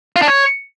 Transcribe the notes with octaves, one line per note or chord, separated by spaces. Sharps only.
F4
D4
C#5